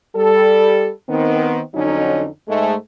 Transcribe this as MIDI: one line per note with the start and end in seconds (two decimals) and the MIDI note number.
0.16 0.91 55
0.16 0.91 69
1.09 1.60 51
1.09 1.60 59
1.09 1.60 60
1.74 2.26 41
1.74 2.26 50
1.74 2.26 54
1.74 2.26 61
1.74 2.26 63
2.48 2.74 44
2.48 2.74 56
2.48 2.74 57